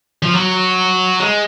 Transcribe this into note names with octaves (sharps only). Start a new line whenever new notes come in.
F3
F#3
G#3